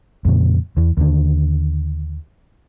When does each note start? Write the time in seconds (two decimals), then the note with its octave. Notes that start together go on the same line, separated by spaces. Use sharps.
0.25 F2 A#2 C#3
0.77 E2 E3
0.97 D#2 D3